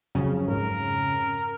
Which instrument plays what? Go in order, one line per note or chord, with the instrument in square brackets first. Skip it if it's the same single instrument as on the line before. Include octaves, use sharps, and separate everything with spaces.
[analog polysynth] F2 C#3 C#4 [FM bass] F#3
[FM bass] G#2 [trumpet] A#4